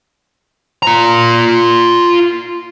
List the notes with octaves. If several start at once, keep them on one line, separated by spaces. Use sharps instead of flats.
F4 A#5